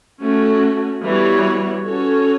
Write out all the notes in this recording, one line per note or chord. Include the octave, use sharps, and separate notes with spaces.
A3 C#4 F#4
E3 G3 B3 F#4 C#5
C#4 F#4 A4 C#5